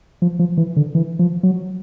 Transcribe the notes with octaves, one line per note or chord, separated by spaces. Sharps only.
F3
F3
E3
D3
E3
F3
F#3